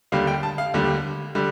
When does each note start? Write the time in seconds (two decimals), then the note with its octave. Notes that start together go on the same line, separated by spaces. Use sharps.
0.12 D#2 D3 G3 F5
0.27 G5
0.43 A5
0.58 F5
0.74 D#2 D3 G3
1.35 D3 G3